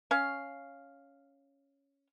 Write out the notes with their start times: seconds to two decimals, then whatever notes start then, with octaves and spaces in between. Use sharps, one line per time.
0.11 C#4 F5